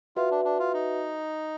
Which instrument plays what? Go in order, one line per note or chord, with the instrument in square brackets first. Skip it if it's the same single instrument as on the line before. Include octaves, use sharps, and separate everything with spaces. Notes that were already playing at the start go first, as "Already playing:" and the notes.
[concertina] F4 [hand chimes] F#4 B4 E5
[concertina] D4
D4
F4
D#4